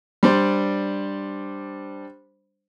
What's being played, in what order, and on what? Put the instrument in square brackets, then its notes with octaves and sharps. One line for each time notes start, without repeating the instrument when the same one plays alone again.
[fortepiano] G3 D4 C5